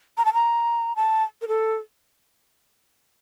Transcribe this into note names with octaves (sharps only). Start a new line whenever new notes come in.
A#5
A5
A#5
A5
A#4
A4